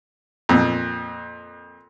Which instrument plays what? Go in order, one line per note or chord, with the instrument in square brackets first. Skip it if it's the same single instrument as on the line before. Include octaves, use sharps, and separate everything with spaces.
[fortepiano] F2 A#2